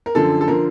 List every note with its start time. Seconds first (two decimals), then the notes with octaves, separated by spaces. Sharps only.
0.06 A#4
0.15 F#2 D3 F3 A4
0.41 A4
0.48 D3 F3 A#4